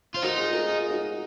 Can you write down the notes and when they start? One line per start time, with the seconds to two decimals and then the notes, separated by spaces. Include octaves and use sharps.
0.14 F4 C5
0.23 D#4 F#4 A#4
0.38 F4 G#4
0.53 F#4 A#4
0.68 F4 G#4
0.90 D#4 F#4